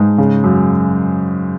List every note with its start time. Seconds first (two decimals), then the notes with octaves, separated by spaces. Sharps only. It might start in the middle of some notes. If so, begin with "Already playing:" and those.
Already playing: G#2
0.18 C#3
0.44 F#2